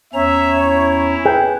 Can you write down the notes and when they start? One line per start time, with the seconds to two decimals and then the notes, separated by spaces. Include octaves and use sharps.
0.14 E2 C#4 C#5 E5 A#5
0.64 E4
1.25 G#4 B4 G5